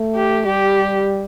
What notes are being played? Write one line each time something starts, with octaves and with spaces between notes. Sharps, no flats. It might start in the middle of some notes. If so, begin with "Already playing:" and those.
Already playing: A3
G4
G3 G4